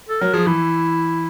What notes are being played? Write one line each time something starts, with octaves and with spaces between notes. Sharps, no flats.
A4
F#3 A#4
F3 G#4
E3 E4